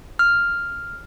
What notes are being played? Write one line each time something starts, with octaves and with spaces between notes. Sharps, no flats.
F6